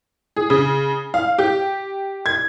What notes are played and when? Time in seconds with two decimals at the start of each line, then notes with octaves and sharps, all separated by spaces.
0.36 G#4
0.50 C#3
1.14 F5
1.38 G4
2.26 G#6